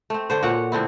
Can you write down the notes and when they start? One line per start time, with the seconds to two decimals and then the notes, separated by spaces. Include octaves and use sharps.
0.10 A3 C4
0.30 D3 C5
0.43 A#2 F#4 C#5 F#5
0.72 A2 D3 C4 E4